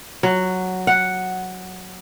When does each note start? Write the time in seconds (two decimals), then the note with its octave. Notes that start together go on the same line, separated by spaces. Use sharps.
0.23 F#3
0.87 F#5